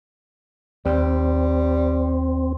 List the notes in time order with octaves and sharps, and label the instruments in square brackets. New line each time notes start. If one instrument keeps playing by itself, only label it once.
[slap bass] D#2 [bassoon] G3 [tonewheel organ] C4